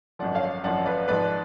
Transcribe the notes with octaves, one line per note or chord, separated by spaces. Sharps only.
G#1 F#2 F3 D5 F#5
C#5 F5
G#1 F#2 F3 D5 F#5
B4 D5
G#1 G#2 F3 B4 D5